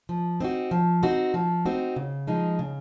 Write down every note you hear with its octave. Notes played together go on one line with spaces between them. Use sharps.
F3
C4 D#4 F#4
F3
C4 D#4 F#4
F3
C4 D#4 F#4
C#3
F3 G#3 D#4
C#3